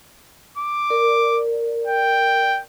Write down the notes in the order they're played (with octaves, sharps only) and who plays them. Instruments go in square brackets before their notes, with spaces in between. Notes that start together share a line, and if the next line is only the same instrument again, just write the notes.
[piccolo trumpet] D6
[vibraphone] A#4 D5
[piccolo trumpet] G5